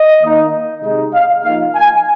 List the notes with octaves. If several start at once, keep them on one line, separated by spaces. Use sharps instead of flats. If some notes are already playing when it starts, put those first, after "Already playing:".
Already playing: D#5
D#3 A#3 D#4
C3 G#3 D#4
F5
F3 A#3 D#4 F5
G#5